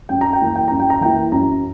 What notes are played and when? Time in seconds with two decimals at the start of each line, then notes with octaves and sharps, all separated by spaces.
0.09 F#2 G5
0.21 A#5
0.33 G5
0.40 E3 A#3 E4 A#5
0.56 G5
0.68 F#2 A#5
0.80 G5
0.90 A#5
1.01 E3 A#3 E4 G5
1.32 F#2 A#5